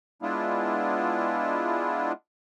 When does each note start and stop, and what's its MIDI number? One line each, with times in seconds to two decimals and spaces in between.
0.22 2.12 56
0.22 2.12 59
0.22 2.12 62
0.22 2.12 64
0.22 2.12 65